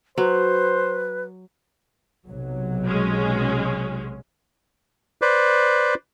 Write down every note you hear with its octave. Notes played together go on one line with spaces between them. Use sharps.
F#3 B4 C5
B1 C3 F#3
G#3 C#4
B4 C5 D5